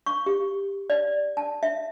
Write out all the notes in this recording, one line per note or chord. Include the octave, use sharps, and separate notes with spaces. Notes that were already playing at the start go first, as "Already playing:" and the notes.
C#6
G4
D5
A5
E5